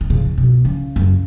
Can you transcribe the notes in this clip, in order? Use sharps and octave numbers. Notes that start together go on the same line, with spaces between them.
D3
C#3
C#3
B2
C#3
F#2